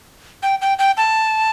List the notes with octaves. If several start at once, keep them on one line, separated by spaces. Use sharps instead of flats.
G5
G5
G5
A5